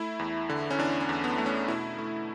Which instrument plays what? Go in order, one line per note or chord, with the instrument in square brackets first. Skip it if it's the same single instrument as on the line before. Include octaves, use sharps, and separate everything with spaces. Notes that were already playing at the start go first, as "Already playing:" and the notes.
Already playing: [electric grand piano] A3 E4
E2
D3
C#4
E2 D4
C#4
E2
B3
A3
C#4
B2 E4
A3